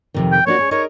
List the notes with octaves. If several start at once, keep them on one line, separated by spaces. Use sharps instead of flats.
F2 C3 D#3
G5
A#3 D4 F#4 C#5
C#4 G#4
D#4 A#4 C#5 D#5